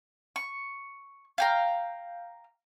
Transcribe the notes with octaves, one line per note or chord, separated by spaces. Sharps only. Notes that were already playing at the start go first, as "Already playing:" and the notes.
C#6
F5 G5 A#5